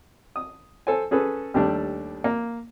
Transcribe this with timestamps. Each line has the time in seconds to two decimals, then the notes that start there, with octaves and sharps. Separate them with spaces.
0.36 D#6
0.87 A4 C5 G#5
1.11 C#4 G#4 A4 B4
1.54 D#2 G3 A3 D4
2.24 A#3